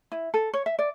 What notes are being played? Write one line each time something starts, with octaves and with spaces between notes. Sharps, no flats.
E4
A4
C#5
E5
D5